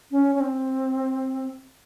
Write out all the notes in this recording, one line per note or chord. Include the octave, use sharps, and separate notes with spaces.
C#4
C#4
C4